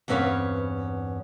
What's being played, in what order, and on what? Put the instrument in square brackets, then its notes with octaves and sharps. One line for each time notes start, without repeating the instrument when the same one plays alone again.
[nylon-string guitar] E2 G2 C4 C#4 B4 F5